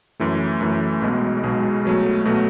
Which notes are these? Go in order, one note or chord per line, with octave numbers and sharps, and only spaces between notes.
F#2 E3 A3
F#2 E3 A3
B1 B2 G#3
B1 B2 G#3
B2 F#3 A3
B2 F#3 A3